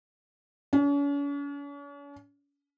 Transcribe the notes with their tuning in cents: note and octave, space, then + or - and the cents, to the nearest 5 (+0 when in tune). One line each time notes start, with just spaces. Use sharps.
C#4 +45